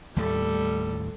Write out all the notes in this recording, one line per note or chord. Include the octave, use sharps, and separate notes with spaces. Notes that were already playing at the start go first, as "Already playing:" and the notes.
D#2 A2 G3 A3 A4